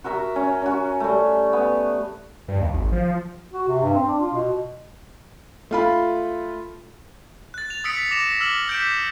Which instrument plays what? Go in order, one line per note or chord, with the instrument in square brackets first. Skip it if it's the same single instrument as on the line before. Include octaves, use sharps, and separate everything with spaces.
[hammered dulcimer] F#4 A#4 E5 A#5
C#4
C#4 F#4
G3 A3
B3
[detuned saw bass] G2
D#2
G#1
F3
[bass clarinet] F#4
C3
G2
C4
D4
F4
B2
[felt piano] A3 F4 B5
[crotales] F#6 A6
F7
D#6 E6 A6 B6 C#7 D7
D6 A#6 C#7 E7 F7
E6 F6 E7 F#7
E6 G6 B6 D7